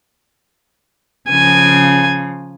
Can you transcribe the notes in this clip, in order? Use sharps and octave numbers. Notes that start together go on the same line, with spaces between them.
C#3 F3 G#5